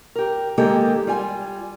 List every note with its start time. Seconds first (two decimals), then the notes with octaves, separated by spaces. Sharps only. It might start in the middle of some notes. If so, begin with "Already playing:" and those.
0.15 G4 A#4
0.58 D#3 G#3 A#3 D#4 G4 A4
1.07 G3 F4 G#5